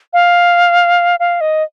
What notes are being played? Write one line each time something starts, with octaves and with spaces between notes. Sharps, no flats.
F5
F5
D#5